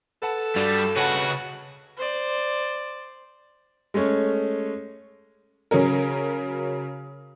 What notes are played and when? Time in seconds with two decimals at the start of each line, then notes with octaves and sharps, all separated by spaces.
0.22 A4 B4 F#5 A5
0.56 G2 G3 F#4 D5
0.96 C#3 F#4 B4 C#5 F#5 A5
1.97 C5 D5
3.94 G#3 A3 C#4 C#5
5.71 C#3 F#3 C#4 A#4